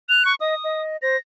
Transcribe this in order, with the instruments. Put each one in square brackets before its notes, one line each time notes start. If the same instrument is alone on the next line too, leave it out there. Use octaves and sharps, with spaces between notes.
[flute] F#6 [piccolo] F7
[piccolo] C#6
[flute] D#5 [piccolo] D#6
[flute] D#5
[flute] C5 [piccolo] A#6